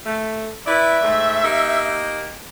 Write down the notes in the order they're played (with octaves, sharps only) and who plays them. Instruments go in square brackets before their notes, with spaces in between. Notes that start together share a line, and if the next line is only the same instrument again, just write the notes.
[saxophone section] A3
[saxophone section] E4 B4 D5 [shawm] E5
[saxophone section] G#2 A3
A#3 D#4 G4